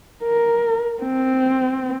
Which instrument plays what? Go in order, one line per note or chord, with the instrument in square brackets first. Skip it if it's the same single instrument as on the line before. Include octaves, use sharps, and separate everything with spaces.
[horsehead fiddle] A#4
C4